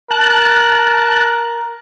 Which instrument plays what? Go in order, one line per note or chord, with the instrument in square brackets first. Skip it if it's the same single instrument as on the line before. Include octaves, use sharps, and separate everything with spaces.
[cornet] A#4 [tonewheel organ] A5 F#6